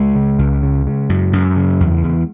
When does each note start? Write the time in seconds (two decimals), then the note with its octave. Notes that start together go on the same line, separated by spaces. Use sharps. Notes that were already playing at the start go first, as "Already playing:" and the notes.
Already playing: C#2 G#3
0.15 C#3
0.39 C#2
0.63 C#3
0.87 C#3
1.09 F#2
1.33 F#2
1.56 C#3
1.80 E2
2.04 E2